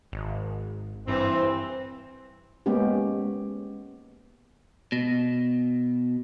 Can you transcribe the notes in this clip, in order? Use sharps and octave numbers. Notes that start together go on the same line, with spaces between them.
G#1
G2 E3 C4
G#3 A#3 B3 C#4 G4
B2